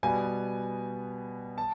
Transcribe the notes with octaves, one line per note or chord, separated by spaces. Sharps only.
B2 G3 B3 G#5
A5